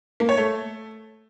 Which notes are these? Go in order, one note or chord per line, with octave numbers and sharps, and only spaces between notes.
A#3
C#5
A3